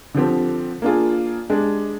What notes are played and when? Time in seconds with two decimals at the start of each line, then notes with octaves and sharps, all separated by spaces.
0.14 D3 F3 C4 G4
0.82 A#3 D4 F4 G#4
1.50 G#3 D4 G4